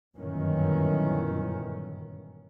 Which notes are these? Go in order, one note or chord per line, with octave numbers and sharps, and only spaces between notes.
G1 F#2 A#2 D#3 E3 C#4